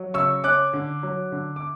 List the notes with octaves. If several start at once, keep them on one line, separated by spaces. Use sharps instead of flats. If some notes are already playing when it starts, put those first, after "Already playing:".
Already playing: F#3
C#3 C#6 E6
C#4 D6 F#6
D3
F#3
D3
D6